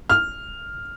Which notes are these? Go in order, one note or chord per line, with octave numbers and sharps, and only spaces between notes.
F6